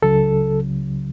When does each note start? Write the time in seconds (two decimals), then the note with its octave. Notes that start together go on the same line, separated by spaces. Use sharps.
0.02 C#2 C#3 F#3 A4